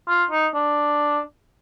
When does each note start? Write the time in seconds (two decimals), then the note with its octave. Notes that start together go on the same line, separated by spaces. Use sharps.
0.08 F4
0.31 D#4
0.55 D4